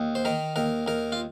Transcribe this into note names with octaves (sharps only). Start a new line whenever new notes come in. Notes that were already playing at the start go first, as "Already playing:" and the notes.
Already playing: D#2
C5
D#3 A#4
D#2 A#4
D#2 A#4
F4